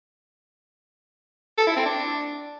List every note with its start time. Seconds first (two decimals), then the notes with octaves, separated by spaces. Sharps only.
1.58 A4
1.67 E4
1.76 C4
1.86 D4